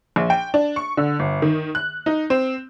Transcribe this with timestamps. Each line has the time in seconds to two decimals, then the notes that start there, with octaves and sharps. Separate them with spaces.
0.16 A#1
0.30 G5
0.54 D4
0.76 C#6
0.97 D3
1.19 G1
1.42 D#3
1.75 F#6
2.06 D#4
2.30 C4